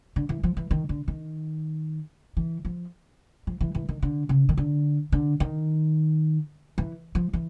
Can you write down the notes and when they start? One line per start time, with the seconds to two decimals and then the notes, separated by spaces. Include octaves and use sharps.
0.16 D3
0.29 E3
0.43 F3
0.57 E3
0.71 D#3
0.89 D3
1.08 D#3
2.37 E3
2.65 F3
3.47 F3
3.61 E3
3.75 E3
3.89 D#3
4.02 D3
4.29 C#3
4.49 D#3
4.57 D3
5.12 D3
5.40 D#3
6.78 E3
7.15 F3
7.33 E3